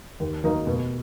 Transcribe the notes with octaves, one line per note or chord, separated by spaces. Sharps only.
D#2
D#3 F#3 A#3 D#4
B2